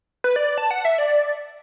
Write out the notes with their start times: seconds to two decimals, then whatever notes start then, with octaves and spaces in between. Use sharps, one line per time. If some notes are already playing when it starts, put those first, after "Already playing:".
0.24 B4
0.36 D5
0.58 A5
0.71 F#5
0.85 E5
0.98 D5